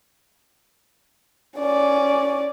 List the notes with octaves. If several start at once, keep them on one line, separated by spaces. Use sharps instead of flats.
C#4 D5